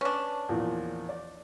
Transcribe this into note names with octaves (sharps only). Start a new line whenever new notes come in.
C#4 D4 B4
E2 A#2 F3
D5